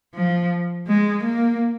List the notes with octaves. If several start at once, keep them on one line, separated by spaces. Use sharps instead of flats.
F3
G#3
A#3